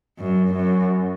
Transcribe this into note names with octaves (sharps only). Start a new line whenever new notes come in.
F#2
F#2